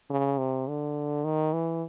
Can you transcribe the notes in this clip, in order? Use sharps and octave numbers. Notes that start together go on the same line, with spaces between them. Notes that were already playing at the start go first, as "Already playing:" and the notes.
C#3
C3
D3
D#3
E3